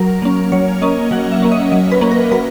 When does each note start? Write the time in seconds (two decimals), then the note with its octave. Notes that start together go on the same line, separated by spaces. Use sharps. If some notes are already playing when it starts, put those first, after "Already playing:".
Already playing: F#3 A#4
0.22 A#3 C#4
0.52 F#3 C#5
0.82 A#3 C#4 D#5
1.11 F#3 F#5
1.32 E5
1.42 A#3 C#4
1.52 D#5
1.72 F#3 D#5
1.92 B4
2.01 A#3 C#4
2.11 A#4
2.31 F#3 B4